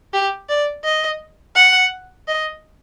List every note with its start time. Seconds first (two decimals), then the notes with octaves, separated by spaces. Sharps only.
0.13 G4
0.49 D5
0.84 D#5
1.56 F#5
2.28 D#5